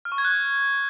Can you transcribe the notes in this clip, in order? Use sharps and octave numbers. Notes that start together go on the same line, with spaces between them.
F6
C#6
G#6
F#6